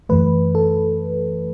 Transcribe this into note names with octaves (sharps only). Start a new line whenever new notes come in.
F#2 E3 A3 B4
A4